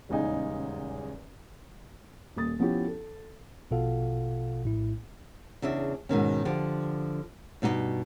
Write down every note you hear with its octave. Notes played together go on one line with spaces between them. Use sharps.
D#1 E2 C#3 G#3 D#4 G#5
D#1 A#3 D#6 A6
F3 B3 C#4 E4 G4
A4
A#1 B2 F4 A4 F5 F#5
A#1 A2 A3 E4
E2 C#3 D4 E5
G#2 B2 D#3 C#4
D3 F3 G4
G2 B2 D#4 F#4 D#5